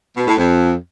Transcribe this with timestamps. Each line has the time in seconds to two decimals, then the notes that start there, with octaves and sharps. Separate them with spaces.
0.17 B2
0.27 A2
0.38 F2